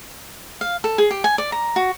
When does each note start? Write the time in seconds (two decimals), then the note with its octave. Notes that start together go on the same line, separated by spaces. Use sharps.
0.61 F5
0.84 A4
0.98 G#4
1.11 G4
1.24 G#5
1.38 D5
1.52 A#5
1.76 F#4